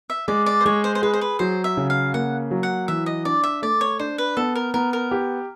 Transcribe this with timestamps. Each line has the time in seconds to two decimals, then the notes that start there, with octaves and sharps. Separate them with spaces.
0.10 E5
0.28 G#3 D5
0.46 D5
0.61 C5
0.66 G#3 C#5
0.84 C5
0.95 C5
1.02 G#4 B4
1.13 C5
1.21 B4
1.39 F#3 C5
1.64 E5
1.77 C#3
1.90 F5
2.14 A#3 F#5
2.51 F#3
2.63 F#5
2.88 E3 E5
3.06 D#5
3.25 D4 D5
3.44 E5
3.62 A3 D5
3.81 C#5
3.99 D4 C5
4.18 B4
4.37 B3 A4
4.56 A#4
4.74 B3 A#4
4.93 A#4
5.11 G4